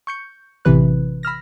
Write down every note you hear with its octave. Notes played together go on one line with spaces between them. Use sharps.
C#6 G6 C#7
A1 C3 E3 B4 F#6
B5 E6 F6 A#6